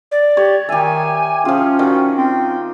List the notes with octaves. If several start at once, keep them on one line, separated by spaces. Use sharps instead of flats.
D5
G4 C#5
D#3 G4 E5 G#5
F3 C#4 F4 G#4
D#3 F#4
C4